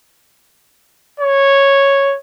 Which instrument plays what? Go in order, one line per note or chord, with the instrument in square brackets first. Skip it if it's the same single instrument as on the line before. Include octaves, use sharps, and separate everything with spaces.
[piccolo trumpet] C#5